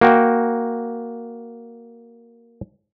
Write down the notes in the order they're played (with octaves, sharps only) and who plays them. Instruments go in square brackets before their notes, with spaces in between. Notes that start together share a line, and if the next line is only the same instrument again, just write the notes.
[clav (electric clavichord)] A#3 F#4 G5